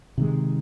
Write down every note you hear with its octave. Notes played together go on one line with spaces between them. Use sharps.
C3 D#3 G#3